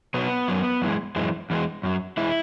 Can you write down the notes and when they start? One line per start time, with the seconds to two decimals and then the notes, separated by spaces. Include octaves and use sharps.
0.14 B2 F#3 B3
0.48 F#2 F#3
0.82 F#2 E3 G#3
1.16 F#2 E3 G#3
1.50 E2 E3 G#3
1.83 F#2 F#3
2.17 E3 G#3 E4